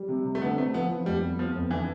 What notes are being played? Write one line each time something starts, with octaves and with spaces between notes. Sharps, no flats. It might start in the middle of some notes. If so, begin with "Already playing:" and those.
Already playing: G3
C3
C3
A3
D3 B3
A3 C4
F3 B3
F3
F2 G3
B3
F3 B3
F2
E3 D4